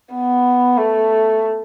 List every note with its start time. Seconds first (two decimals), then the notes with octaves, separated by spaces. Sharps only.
0.14 B3
0.77 A3